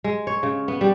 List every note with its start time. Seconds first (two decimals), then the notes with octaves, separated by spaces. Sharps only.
0.04 G#3
0.27 C#5
0.43 C#3
0.68 B3
0.81 G3